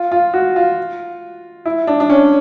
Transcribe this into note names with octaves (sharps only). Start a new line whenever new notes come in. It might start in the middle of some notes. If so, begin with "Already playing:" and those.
Already playing: F4
F4
F#4
F4
E4
D4
D4
C#4